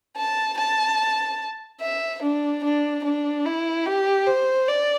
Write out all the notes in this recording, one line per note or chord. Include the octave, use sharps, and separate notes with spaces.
A5
A5
E5
D4
D4
D4
E4
G4
C5
D5